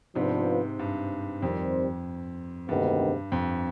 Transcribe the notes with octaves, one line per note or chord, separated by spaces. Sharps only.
G#2 C3 F3 B3 D4 F4 B4
G2
F2 D#3 G3 C4 G4 C5
D2 G2 C3 D#3 G#3 B3
F2